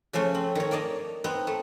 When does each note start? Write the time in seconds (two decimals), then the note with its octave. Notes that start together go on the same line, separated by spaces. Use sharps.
0.13 C#3 F3 A3 C#4
0.35 C4
0.55 D#3 C#5
0.71 A#3 D5 D#5 A5
1.24 B3 C4 D#4
1.47 A3